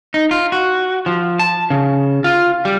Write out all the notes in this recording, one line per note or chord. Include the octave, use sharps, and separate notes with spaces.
D#4
F4
F#4
F3
A5
C#3
F4
G3